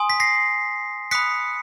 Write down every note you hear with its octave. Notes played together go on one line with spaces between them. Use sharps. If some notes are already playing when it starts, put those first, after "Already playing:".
Already playing: G#5 C6 D#6
B6
A#6 C7
B5 D#6 F#6 B6 C#7